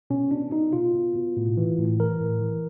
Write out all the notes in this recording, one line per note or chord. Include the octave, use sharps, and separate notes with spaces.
B2 C#4
B2 D4
B2 D#4
B2 F4
B2
B2
A2
E3
A2
E3 A#4
A2
E3